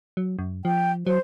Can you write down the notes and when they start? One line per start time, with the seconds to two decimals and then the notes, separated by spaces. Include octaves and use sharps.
0.17 F#3
0.39 F#2
0.65 F3 G5
1.07 F#3 C5